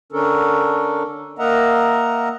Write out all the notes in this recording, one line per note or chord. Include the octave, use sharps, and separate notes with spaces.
D3 C#4 D4 A4 A#4
A#3 A#4 D#5 E5 F#5 A#5